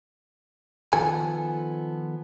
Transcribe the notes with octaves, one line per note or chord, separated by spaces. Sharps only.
D#3 F3 B3 A4 G#5